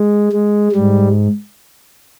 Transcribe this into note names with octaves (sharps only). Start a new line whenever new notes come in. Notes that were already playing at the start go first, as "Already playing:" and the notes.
Already playing: G#3
G#3
G#2 G3